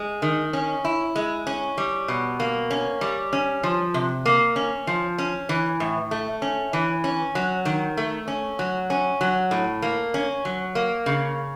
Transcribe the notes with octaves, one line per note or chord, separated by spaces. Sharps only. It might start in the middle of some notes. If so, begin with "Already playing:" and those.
Already playing: G#3
D#3
C#4
E4
G#3
C#4
G3
B2
A#3
C#4
G3
C#4
F3
C3
A#3
C#4
F3
C#4
E3
A2
A3
C#4
E3
C#4
F#3
D#3
A3
C#4
F#3
C#4
F#3
A2
A#3
C#4
F#3
A#3
C#3